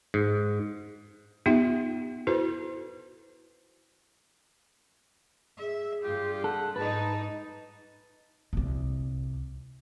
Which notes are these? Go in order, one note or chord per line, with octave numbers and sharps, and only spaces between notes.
G#2
B3 D#4 F4 G4 E5 G5
E4 F#4 A4 B4 C5
G#4 E5
G2 F4 G4
A4 F#5
G#2 D#4 B4 A5
C2 A#2